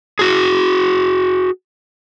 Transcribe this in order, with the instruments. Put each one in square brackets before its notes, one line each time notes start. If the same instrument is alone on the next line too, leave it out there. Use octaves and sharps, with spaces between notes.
[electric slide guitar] F#4 G#4